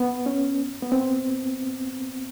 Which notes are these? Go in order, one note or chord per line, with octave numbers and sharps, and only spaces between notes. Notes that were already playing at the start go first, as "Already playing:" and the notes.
Already playing: B3
C#4
B3
C4